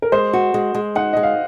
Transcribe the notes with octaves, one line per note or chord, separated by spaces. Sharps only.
A#4
G#3 C5
F#4
G#3
G#3
D#4 F#5
G#3 D#5
F5